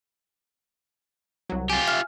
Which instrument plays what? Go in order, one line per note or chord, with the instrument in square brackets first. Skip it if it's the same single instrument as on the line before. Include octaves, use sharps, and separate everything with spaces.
[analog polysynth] C2 F#3
[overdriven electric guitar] F4 G4 [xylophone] G#5
[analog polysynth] E5 [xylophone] F6